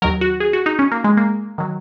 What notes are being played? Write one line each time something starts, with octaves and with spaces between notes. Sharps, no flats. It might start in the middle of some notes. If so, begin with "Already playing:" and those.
D#2 D#3 F#3 A#4
F#4
G#4
F#4
D#4
C#4
A#3
G#3
A#3
D#3 F#3